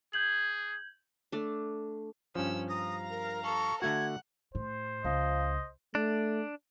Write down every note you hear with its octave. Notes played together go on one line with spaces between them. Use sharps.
G#4 G6 G#6 F#7
A3 D4
G2 F3 C#4 E6
F5 A#5 D#6 A#6
A#4
A4 C#6
D3 A3 F#4 F#5 G#6
A2 C5
C#2 F3 D#5
A3 D4